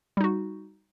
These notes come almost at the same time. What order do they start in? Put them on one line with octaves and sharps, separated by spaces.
G3 D#4 F#4